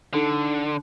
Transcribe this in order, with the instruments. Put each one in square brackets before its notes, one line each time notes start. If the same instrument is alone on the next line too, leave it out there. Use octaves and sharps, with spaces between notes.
[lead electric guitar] D3 [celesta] D4 D#4 A4